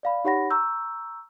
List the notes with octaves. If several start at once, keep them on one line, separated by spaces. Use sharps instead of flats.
D5 F5 B5
D#4 G4 C#5 F#5 B5 A#6
A#5 C#6 E6 G6